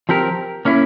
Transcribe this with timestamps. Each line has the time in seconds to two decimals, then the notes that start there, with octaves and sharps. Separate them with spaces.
0.09 F3 C4 G4 A#4
0.65 A#3 C#4 E4